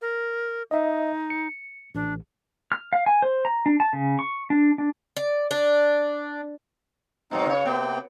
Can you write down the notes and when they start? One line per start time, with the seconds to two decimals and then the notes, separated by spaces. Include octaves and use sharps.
0.01 A#4
0.71 D#4 D#5 E5
1.30 C#7
1.95 A1 D4
2.72 F6
2.93 F5
3.06 G#5
3.22 C5
3.45 A#5
3.66 D4
3.80 A5
3.93 C#3
4.19 C#6
4.50 D4
4.78 D4
5.17 D5
5.51 D4
7.31 G#2 B2 F#3 C4 D#4
7.46 C#3 C#5
7.66 C3 A#3 B3 G5